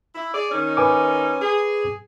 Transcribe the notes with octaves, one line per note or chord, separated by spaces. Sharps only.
E4
G#4 D5
D#3 C#4 D#4
B4 G#5 D6
G#4